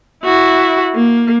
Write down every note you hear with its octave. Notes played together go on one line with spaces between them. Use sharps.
E4 F#4
A#3